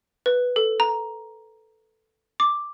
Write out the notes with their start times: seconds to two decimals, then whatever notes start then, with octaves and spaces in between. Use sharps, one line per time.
0.26 B4
0.56 A4
0.80 A#5
2.40 D6